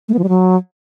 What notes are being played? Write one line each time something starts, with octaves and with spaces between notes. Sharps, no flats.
A3
B3
F3
G3
F#3